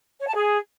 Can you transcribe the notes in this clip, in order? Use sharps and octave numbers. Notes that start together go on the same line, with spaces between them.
C#5
A5
G#4